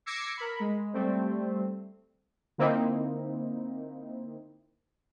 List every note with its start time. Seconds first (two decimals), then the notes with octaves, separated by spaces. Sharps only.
0.06 D6 E6 G#6 A#6 C7 C#7
0.37 A#4 B5
0.60 G#3
0.93 G3 A3 C4
2.58 D3 A#3 C4 D#4 E4